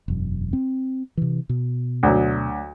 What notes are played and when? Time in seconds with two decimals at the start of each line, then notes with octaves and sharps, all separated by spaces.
0.08 E1 F#2
0.53 C4
1.17 C3 E3
1.49 B2
2.03 D2 F#3